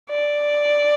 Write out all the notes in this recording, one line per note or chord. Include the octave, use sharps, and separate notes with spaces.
D5